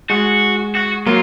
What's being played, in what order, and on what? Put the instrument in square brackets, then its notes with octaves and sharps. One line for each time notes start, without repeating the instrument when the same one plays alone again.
[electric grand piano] G#3 [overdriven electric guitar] F#4
[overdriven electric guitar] F#4
[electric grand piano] F#3 A#3 [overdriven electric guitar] F4